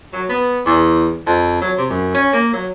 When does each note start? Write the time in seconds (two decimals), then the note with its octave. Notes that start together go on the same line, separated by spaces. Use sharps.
0.13 F#3
0.29 B3
0.66 E2
1.26 F2
1.61 F#3
1.77 C3
1.90 F#2
2.14 C#4
2.33 A#3
2.53 F#3